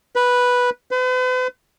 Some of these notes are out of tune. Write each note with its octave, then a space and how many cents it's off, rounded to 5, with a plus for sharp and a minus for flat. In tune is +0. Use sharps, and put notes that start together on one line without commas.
B4 -5
B4 +45